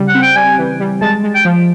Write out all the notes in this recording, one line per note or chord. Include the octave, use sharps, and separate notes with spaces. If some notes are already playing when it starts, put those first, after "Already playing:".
Already playing: C#3 G3
F#5
C4
G5
G3 G#5
E3
G3
G#3 A5
G#3
G5
F3